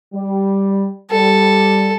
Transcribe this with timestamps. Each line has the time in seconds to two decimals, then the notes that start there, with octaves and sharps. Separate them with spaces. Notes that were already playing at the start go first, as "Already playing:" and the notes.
0.13 G3
1.11 G3 A4